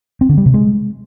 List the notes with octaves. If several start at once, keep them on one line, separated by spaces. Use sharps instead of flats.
C4
D3
G3
C3
G#3